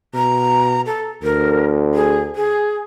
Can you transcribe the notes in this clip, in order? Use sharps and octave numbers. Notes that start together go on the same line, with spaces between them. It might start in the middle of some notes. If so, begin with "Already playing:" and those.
B2 A#5
A4
D2 A#4
G#4
G#4